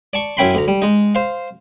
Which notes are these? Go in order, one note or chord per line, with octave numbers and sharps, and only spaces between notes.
D5 A5 C#6
F#2 C#4 E4 G5 B5 C6
D2 A#5
G3
G#3 D#4
C5 F5